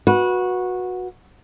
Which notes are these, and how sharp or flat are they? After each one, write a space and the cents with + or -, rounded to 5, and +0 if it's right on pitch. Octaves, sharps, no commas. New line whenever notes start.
F#4 -15 B4 -20